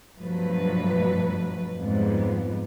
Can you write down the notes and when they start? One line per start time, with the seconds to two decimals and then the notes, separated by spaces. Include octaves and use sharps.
0.18 G2 B2 F3 F#3 A3 B4
1.77 F2 G#2 F3 G3 B3